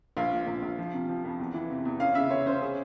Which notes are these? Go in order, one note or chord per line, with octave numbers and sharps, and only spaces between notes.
A#1 F5
A#2
A#1
A#1
F3
C3
F3
F2
E2
E3
C3
E2
C#4 F5
C#3 E5
C#3 C#5
C#4 C5
G#4